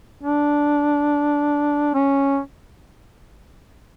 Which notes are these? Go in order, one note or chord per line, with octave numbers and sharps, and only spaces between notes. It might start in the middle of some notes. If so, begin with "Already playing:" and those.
D4
C#4